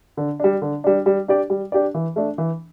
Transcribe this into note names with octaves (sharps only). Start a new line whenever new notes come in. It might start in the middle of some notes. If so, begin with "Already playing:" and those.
D3
G3 D4
D3
G3 D4
G3
D4 G4 D5
G3
D4 G4 D5
E3
A3 D4
E3